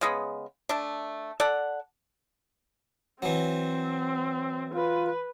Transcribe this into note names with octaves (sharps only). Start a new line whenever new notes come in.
C#3 G#3 B3
A3 D4
A4 D5 F#5
E3 F#3 C4
F4 B4